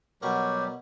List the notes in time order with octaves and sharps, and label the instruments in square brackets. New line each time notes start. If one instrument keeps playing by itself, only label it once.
[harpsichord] B2 F#4 A#4 [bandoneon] F#3 G3 G4